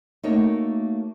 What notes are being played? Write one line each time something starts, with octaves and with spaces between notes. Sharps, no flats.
A3 A#3 D#4 F#4 C#5